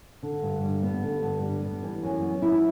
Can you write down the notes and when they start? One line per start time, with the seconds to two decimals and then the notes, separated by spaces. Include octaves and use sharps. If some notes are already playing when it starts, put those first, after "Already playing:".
0.23 D3
0.42 G2
0.63 G3
0.83 B3
1.03 D3
1.23 G2
1.43 G3
1.62 B3
1.83 E3
2.03 F#2
2.22 B3
2.42 E4